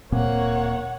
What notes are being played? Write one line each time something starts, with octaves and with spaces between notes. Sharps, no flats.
D1 A#2 A#3 C4 C#5 F#5